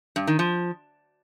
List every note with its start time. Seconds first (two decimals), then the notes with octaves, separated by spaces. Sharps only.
0.16 G2
0.27 D#3
0.39 F3